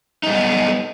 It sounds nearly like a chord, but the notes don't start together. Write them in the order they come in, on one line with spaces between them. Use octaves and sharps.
D#4 G3 B3